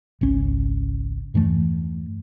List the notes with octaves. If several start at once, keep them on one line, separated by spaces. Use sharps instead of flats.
G#1 C#2 C#4
E2 G2 E3 A3